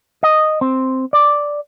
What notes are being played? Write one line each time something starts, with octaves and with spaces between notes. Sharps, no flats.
D#5
C4
D5